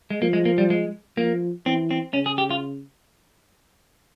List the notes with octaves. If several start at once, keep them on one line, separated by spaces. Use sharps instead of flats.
G#3
F3 A#3
G#3
A#3
G3
G#3
F3 A#3
E3 C4
C4
C#3 C#4
G#4
G4
F4